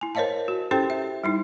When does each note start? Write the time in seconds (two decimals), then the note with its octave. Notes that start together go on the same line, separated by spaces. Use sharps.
0.01 E4 G#5
0.15 A#4 C5 C#5 D#5 F5 A5
0.48 F#4
0.71 C#4 E4 G4 A4 C5 G5
0.90 E5
1.24 G3 D#4 E4